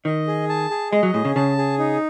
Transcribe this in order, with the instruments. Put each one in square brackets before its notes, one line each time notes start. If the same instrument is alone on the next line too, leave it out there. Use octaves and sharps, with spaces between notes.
[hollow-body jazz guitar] D#3 [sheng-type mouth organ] D#5
[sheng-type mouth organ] G#4
A5
G#4
[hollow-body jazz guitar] G#3 [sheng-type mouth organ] D#5
[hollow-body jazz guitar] F#3
[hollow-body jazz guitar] A2 [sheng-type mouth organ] G#4
[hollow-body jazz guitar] C#3
[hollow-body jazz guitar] C#3 [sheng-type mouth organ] A5
[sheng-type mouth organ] G#4
D#4